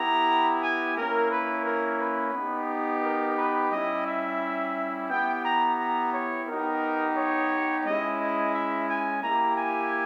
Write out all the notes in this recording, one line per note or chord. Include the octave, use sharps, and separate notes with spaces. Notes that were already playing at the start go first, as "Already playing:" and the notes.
Already playing: B3 E4 G4 A#5
G#5
A#3 C#4 E4 A#4
B4
A#4
B4
B3 D#4 G4
A#4
B4
G3 C#4 E4 D#5
E5
B3 E4 G4 G5
A#5
A#5
C#5
B3 D#4 G4 A#4
C#5
G#3 C#4 E4 D#5
D#5
E5
G#5
A#3 E4 G4 A#5
G#5